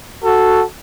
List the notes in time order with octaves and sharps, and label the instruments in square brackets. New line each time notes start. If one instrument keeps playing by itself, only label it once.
[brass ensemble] F#4 [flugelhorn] A4